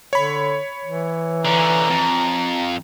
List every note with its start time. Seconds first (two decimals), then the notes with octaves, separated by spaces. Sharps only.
0.13 D3 C#5 B5
0.84 E3
1.45 D3 C#4 A#5
1.90 F2